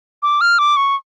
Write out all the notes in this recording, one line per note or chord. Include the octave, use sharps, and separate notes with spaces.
D6
F6
D6
C#6